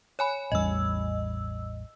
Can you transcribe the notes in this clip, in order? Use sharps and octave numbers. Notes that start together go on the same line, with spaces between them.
C#5 G#5 B5
A1 E2 G3 D#5 E6